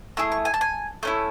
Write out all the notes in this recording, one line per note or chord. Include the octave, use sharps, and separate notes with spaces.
A3 E4 G#4 E6
C#6
G#5
A5
G#5
A3 C#4 E4